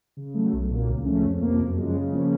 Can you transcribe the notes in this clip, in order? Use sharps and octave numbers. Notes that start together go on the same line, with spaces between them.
C#3
F#3 A3
B1
A#2 F#3 A#3
C#2
C#3 F3 A3 C#4
F2
C3 F3 A#3
F#2
C#3 F3 G#3
C#3
F3 A#3 C#4